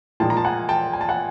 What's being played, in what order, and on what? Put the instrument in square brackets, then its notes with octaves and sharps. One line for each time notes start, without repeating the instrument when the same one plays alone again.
[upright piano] A#2 F3 G#3 G5 A5
A#5
A5
F#5 G#5
G5 A5
G#5
A5
F#5 G#5